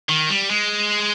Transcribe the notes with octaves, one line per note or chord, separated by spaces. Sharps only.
D#3
G3
G#3